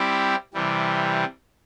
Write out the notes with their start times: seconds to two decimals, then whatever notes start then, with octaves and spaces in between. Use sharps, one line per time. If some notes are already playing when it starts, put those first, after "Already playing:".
Already playing: G3 C4 E4 G4
0.53 C3 E3 G3